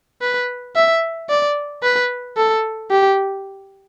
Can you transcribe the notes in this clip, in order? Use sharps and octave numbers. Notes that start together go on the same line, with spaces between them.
B4
E5
D5
B4
A4
G4